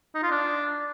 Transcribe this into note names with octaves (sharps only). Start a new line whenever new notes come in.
D#4
F4
D4